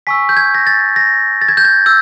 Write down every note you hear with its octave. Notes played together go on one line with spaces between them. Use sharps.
G#5 C#6 E6 B6
G6
G#6
A#6
A6
A#6
A6
G#6
G6
G#6
E6 G6